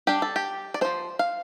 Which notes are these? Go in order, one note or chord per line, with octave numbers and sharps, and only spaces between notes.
G3 D4 G4
A4
G4
D5
F3 C4 C5
F5